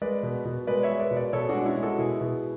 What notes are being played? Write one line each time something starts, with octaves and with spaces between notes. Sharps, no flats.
G#3 B4 D5
B2
B2
G#3 B4 D5
C#5 E5
G#3
B4 D5
B2
B4 D5
B2 A4 C#5
G#4
D4 F#4
G#3
F#4
C#4 E4
G#3
F#4 A4
B2 E4 G#4
B2